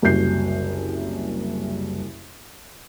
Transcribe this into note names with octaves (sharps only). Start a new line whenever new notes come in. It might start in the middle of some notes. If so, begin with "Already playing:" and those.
F#1 C2 F#4 G6 C7